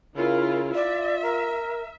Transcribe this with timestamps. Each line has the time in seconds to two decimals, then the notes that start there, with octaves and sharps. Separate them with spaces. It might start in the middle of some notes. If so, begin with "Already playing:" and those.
0.17 C#3 E4 F4 A#4
0.75 F4 D5 E5
1.23 A#4